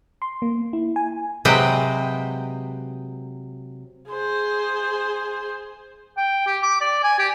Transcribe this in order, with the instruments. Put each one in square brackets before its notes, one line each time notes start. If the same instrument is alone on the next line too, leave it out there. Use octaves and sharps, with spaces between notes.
[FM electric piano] C6
A#3
E4
G#5
[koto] C3 F#3 G#3 B4 D#5 G5
[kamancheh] G#4 C5
[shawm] G5
G4
D6
D5
G#5
G4